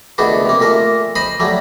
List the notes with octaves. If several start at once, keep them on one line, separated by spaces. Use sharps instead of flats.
C#2 D#3 A3 B3 D4 F#4
C3 A#3
A#2 A3 A#4
C5 D#5 B5 C6
F#3 G3 A3